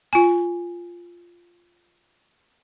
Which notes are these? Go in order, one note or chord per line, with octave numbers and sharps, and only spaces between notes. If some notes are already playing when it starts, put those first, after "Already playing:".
F4 G#5